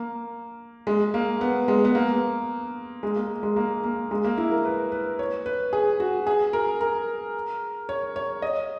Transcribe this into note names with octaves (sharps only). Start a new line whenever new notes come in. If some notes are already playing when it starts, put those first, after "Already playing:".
Already playing: A#3
G#3
A#3
B3
G#3
B3
A#3
G#3
A#3
G#3
A#3
A#3
G#3
A#3
E4
A#4
B4
B4
C#5
B4
G#4
F#4
G#4
A#4
A#4
C#5
C#5
D#5